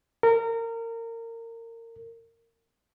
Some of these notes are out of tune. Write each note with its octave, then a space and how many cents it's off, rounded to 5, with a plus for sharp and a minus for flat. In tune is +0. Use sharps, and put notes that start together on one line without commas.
A#4 -25